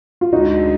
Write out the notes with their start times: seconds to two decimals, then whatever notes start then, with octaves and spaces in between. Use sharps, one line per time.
0.21 F4
0.32 D2 D3 G#3 D#4 F#4